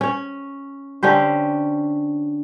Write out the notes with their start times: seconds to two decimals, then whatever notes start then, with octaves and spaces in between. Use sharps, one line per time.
0.01 C#4 C#5
1.03 D3 C#4 G4 C5